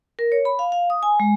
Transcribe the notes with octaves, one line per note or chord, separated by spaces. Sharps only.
A#4
C#5
B5
F5
F5
D#6
G#5
G#3